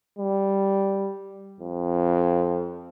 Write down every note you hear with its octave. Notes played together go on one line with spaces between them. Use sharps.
G3
F2